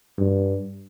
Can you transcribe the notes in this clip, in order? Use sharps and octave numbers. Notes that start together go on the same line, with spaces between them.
G2